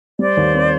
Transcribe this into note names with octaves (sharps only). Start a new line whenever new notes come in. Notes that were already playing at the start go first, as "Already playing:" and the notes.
G3 C5 D5
D#2
C4